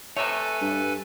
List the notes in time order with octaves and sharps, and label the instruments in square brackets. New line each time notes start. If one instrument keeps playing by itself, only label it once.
[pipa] C3 A3 [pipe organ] A4 B4 G#5 [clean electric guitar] C#5 E5
[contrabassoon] G2